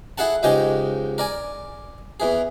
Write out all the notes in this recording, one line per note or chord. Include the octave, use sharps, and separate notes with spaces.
E4 G#4 A4 F#5 A5
C#2 G#2 C#3 G4 D#5 G#5
A#4 D5 G#5
E2 E3 G#4